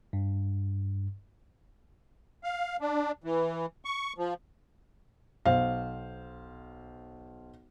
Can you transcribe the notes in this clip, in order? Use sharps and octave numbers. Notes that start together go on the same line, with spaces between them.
G2
F5
D4
E3
C#6
F3
B1 C5 F5